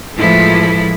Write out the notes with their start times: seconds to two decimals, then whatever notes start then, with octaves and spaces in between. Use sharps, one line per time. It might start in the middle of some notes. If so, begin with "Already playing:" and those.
0.17 A2 E3 F3 G#3 E4 A4